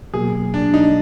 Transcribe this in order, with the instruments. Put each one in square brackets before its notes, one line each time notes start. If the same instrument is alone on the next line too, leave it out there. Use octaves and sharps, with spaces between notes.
[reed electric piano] B2 F#3 A#3 [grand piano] G#4
[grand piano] D4
D#4